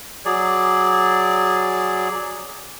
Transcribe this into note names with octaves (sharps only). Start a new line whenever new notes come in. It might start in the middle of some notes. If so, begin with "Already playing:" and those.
F#3 G#4 D5